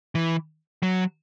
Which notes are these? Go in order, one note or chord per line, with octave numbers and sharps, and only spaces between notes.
E3
F#3